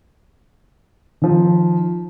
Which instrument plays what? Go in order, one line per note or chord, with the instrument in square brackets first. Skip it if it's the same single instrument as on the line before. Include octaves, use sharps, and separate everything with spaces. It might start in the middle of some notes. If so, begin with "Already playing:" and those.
[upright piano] D#3 F3